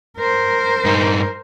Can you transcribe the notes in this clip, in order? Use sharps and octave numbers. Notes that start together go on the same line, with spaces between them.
A#4 C5
G2 D#4